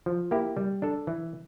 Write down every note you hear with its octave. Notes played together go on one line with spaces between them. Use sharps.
F3
A#3 E4 G4
G3
D4 A4
E3